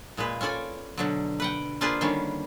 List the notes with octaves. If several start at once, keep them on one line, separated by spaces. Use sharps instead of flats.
A#2 G#3 G#4 B4
C#4 F4 A4 D5 G#5
B2 D3 F#3
B4 F#5 G5
A#3 D4 F4 G#4 B4 C5
D3 D#3 G3 G#3 C#4